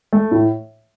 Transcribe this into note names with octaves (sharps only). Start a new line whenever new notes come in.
A3
A2